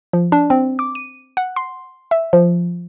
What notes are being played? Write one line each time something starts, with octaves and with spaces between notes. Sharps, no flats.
F3
D4
C4
D6
D#7
F#5
C6
E5
F3